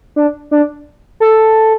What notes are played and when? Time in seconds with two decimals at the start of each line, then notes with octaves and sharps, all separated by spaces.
0.16 D4
0.51 D4
1.20 A4